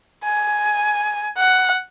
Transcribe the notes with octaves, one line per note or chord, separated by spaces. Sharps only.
G#5
F#5